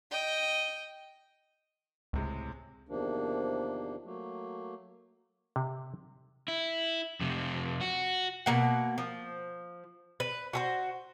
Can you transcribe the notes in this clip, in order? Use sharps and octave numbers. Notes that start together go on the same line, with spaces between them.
D#5 G5
C#2 A2 C3 G#3
E2 C3 D#3 F3 A#3 D4
F#3 A3 A#3
C3
E4
F2 C3
F#4
B2 A#3 F#5
F3
B4
F#4 A4 C5